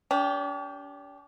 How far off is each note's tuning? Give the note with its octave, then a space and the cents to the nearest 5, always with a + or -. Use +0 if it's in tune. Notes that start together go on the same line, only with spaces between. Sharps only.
D4 -45 G4 +0